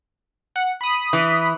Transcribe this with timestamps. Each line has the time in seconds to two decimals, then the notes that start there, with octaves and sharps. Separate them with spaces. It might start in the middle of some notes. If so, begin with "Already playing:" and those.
0.56 F#5
0.81 B5 D#6
1.13 E3